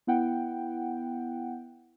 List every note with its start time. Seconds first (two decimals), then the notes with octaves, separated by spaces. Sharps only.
0.07 B3 E4 F#5 G5